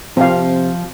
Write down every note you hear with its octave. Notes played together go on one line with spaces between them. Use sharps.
C3 F3 C4 F5